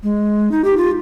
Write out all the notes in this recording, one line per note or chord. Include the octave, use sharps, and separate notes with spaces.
G#3
D#4
G4
F4